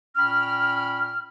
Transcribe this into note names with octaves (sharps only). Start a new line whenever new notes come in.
A#2 C#4 G5 B5 F6